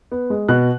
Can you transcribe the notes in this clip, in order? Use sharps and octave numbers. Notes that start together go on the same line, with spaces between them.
B3
G#3
B2 F#6